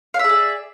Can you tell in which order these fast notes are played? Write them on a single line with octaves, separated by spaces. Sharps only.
F5 E5 G#4 D5